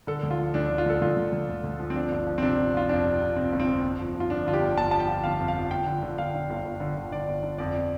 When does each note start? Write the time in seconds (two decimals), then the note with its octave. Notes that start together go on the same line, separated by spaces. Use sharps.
0.07 D3 A4
0.23 D2
0.31 F4
0.38 F3
0.54 D2 D4
0.67 D4
0.70 D2
0.78 F4
0.86 D2 A4
1.01 D2 F4
1.17 D2
1.32 D2
1.49 D2
1.64 D2
1.80 F3
1.90 C4
1.95 F3 D4
2.12 G1
2.27 F3
2.38 C4
2.42 C3 D4
2.57 C3
2.74 F3 F4
2.89 F2 D4
3.05 C3
3.21 C3
3.36 C3 C4
3.52 G1
3.60 C4
3.67 F2
3.83 G1
3.99 F3
4.14 G1
4.20 F4
4.30 F3 D4
4.46 D3 F4
4.53 G4
4.62 G1
4.78 G1 A5
4.91 F3 A5
5.00 G5
5.08 F3
5.24 G1 F5
5.39 F2
5.48 F5
5.56 F3
5.71 G1 G5
5.87 D3
6.03 D3
6.17 G1 F5
6.34 D3
6.50 G1
6.65 G1
6.80 D3
6.97 D3
7.12 D3 D5
7.28 G1
7.43 D3
7.58 F2 D5